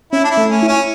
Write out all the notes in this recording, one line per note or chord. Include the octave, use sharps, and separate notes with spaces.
C#4 E4
D4
E4
A3
C#4
E4
C#4